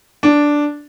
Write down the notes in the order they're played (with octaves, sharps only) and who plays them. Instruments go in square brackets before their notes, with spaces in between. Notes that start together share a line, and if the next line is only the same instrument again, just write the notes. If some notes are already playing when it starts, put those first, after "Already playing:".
[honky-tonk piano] D4